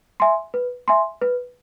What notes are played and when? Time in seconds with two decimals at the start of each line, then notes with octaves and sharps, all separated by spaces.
0.20 E5 G#5 C6
0.54 B4
0.88 E5 G#5 C6
1.22 B4